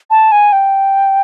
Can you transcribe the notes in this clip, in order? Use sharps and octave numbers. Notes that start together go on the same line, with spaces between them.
A5
G#5
G5